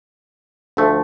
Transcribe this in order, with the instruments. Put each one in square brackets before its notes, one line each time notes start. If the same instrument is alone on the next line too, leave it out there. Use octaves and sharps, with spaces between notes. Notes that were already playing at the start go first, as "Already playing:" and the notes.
[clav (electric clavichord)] D2 D3 F3 A3